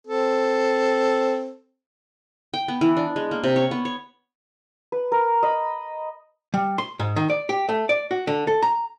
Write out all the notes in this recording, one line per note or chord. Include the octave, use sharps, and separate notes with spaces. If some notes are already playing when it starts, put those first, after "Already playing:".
C4 A4
G5
B3
E3
D4
G#3
A#3
C3
C#5
B3
C#5
B4
A#4
D#5 B5
G3
C6
G#2
D#3
D5
G4
A3
D5
F#4
D3
A4
A#5